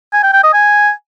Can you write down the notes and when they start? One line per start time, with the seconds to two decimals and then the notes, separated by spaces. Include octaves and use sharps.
0.13 G#5
0.23 G5
0.33 G5
0.43 D#5
0.54 G#5